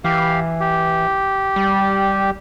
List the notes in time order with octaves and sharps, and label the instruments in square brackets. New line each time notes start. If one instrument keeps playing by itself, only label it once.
[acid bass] E3 [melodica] G4 F5
[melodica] G4
[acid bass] G3